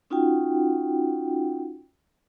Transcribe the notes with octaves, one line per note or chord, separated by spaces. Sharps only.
C#4 D#4 F4 F#4 F#5 G5